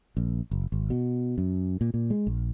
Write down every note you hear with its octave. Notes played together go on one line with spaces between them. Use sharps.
A#1
F#1
G#1
B2
F#2
A#2
A#2
G#3
A#1